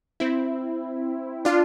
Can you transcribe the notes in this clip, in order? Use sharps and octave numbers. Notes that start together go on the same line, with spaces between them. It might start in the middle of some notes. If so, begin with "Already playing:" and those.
C4 E4
D4 F4